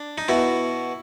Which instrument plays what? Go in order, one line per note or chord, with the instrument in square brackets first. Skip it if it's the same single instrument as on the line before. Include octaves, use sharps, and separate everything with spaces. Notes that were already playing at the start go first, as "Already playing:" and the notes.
Already playing: [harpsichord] D4
D#4
B2 E4